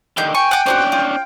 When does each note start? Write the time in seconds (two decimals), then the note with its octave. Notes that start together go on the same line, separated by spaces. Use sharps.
0.17 D3 D#3 G4 F5 G6
0.35 G5 G#5 C#6
0.51 F#5 D6
0.66 C#4 D4 F#4 G#4 C5
0.92 F4